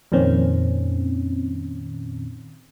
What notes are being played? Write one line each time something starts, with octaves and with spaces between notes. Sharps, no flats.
F2 A#2 D#3 C4 C#4